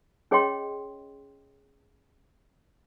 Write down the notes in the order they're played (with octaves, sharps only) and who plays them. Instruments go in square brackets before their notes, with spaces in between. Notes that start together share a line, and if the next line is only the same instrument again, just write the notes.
[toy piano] C#4 G#4 C#5 D#5 G5 C6